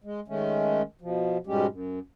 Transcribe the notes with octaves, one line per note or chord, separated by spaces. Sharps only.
G#3
D#3 G#3 A3 C#4
B2 F3
G#2 B2 G3 G#3 C#4 G4
F#2